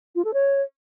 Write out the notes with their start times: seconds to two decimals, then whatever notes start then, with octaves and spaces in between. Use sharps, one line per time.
0.15 F4
0.24 A4
0.34 C#5